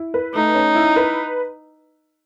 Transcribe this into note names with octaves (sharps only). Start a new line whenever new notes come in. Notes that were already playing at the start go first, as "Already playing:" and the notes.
Already playing: E4
B4
A3 D#4
C#4
E4
B4